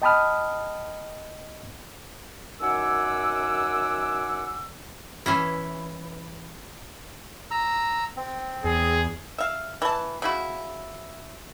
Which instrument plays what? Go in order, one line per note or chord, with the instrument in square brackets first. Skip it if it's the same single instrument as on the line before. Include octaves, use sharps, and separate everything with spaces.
[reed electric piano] D#5 G5 A5 B5 D#6 F6
[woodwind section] F#2 D#3 F#5 G#5 D6 E6
[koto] E3 C#4 E4
[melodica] A#5 E6
C4
[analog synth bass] E2 [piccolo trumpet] G#4
[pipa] E5 F5
E3 A5
C#3 E4 F#4